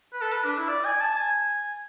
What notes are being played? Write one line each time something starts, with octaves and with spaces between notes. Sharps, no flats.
B4
A4
B4
D4
E4
D5
G#5
A5
G#5